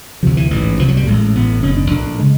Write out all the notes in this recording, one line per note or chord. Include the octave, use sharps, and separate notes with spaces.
D2 C3 F3
E3
A1 G#2 E3
C2 B2 F3
F#3
G3
A1 A2 G#3
A1 A2 B3
F#1 E2 B2 C#4
D4
A#1 A2 D4
C#3 G#3